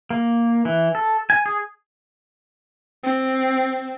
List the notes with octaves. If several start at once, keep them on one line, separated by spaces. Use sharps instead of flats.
A#3
E3
A4
G#5
G#4
C4